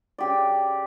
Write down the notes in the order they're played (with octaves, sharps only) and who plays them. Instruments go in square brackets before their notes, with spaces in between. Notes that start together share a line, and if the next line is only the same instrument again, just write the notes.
[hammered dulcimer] C#3 G4 D5